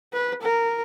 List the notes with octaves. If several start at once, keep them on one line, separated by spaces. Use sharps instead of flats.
B4
A#4